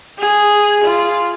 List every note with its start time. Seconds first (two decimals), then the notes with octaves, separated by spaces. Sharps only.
0.19 G#4
0.84 F4